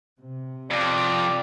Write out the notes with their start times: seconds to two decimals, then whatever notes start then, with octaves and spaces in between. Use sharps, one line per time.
0.17 C3
0.71 F2 D5